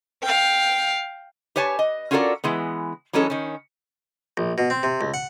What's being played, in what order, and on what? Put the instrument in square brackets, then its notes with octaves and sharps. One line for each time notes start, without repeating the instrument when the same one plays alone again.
[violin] F5 G5
[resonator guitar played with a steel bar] G4 B4 C#5 G#5 A5
D#5
C#4 F4 F#4 A4 A#4 D5
E3 G#3 B3
E3 F#3 G#3 C#4 A4
D#3 C#4
[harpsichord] A#1
B2
C4
C3
C#2
F#5